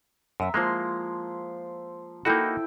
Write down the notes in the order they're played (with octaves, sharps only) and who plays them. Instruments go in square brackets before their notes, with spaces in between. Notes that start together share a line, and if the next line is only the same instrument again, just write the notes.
[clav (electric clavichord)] F#2 [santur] E5 A#5
[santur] F3 C6 [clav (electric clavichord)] G#3 A#3
[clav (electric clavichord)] A#3 D#4 F#4 [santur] E4 A4 G5